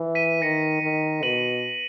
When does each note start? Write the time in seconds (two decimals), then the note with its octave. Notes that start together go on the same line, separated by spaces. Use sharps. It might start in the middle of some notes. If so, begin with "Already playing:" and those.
Already playing: E3
0.15 B6 D#7
0.42 D#3 A#6 C#7
0.82 D#3
1.23 B2 D#7 F#7